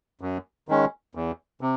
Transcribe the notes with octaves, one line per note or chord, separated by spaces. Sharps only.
F#2
D#3 G#3 C#4
E2
C3